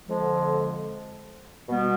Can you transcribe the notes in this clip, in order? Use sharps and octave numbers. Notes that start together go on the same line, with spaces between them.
F2 D3 F3 G#3
B2 G3 B3